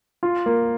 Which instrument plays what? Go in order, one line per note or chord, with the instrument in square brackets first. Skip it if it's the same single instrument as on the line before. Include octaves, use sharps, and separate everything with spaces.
[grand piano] F4
A#3